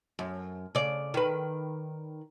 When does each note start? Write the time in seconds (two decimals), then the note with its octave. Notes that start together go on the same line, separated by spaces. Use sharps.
0.19 F#2
0.75 C#3 D5
1.14 D#3 B4